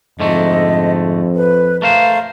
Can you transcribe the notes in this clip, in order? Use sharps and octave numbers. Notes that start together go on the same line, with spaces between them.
F2 G#2 D3 A3 D#5
B4
A3 A#4 C5 F5